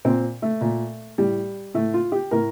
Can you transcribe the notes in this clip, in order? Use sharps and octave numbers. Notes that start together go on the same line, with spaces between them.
A#2 C4
A3
A#2
A2 G3
A2 A3
F4
G4
A2 A#4